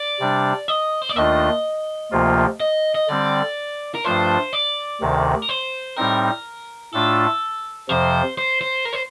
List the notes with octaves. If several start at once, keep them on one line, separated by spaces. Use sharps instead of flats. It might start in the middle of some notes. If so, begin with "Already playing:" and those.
Already playing: D5
C3 G3 D4
D#5
C5
D5
D#2 D#3 A3 D4 F4 D#5
D2 C3 F3 A#3 F4
D#5
D#5
D3 G3 C4 D5
A#4
G2 F3 A3 D4 F4 C5
D5
D2 C3 D#3
A#4
C5
A2 G3 C4 D#4 A#4
A2 A3 D4 F4 A4
F2 C3 F3 C5
C5
C5
A#4
C5